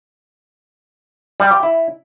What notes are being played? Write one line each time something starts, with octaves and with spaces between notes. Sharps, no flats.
G3
G4
E4